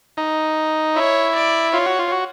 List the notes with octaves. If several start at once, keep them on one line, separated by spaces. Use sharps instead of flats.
D#4
E4 C#5
D5
F4 C#5
F#4
F4
F#4